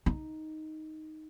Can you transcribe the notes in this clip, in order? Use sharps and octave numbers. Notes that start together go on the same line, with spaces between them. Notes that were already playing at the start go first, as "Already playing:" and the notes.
D#4